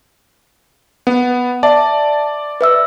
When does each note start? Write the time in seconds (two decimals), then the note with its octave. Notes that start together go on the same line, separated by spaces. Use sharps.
1.07 B3 F#5
1.63 D5 E5 A5
2.61 B4 E5 E6